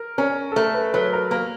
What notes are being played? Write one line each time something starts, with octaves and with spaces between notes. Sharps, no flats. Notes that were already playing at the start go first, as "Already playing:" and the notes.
Already playing: A#4
C#4 A#4
A4
A3 A#4
B4
F#3 B4
A#4
A#3 A#4